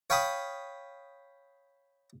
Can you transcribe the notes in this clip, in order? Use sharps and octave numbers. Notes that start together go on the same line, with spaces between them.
C#5 F5 G5 B5 D#6